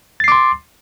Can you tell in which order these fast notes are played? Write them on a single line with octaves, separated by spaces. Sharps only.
A6 C7 D6 C6